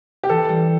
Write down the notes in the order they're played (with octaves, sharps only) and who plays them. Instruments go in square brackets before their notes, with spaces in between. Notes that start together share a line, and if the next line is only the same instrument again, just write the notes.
[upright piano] G4
[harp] E3 [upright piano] A4
[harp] G3